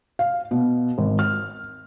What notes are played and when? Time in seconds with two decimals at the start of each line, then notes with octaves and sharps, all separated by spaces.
0.19 F5
0.51 B2
0.98 G#1
1.19 F6